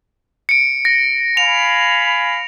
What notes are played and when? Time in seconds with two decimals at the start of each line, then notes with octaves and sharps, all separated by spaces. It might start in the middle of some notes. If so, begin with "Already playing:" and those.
0.49 C#7 D7
0.85 A#6
1.37 F5 G#5 B5 F7